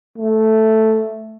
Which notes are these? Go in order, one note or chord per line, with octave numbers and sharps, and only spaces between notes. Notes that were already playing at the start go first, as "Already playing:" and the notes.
A3